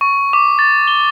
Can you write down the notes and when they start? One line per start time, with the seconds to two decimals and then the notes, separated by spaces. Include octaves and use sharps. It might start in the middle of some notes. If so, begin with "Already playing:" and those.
0.01 C#6
0.33 D6
0.59 A6
0.88 G7